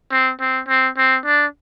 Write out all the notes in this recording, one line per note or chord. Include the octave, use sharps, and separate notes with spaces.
C4
C4
C4
C4
D4